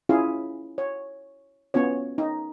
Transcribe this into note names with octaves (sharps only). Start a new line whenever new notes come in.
C#4 E4 F4 G#4 F5
C#5
B3 C#4 F4 C#5
D#4